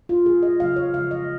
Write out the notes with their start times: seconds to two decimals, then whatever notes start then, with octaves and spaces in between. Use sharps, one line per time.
0.09 F4
0.26 A#2 G#3 G#4
0.43 D#5
0.60 C#3 F#3 A#3 F5
0.76 C#5
0.94 C#3 F3 G#3 F5
1.11 D#5